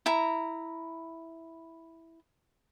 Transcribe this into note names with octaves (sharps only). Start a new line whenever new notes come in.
E4 A#5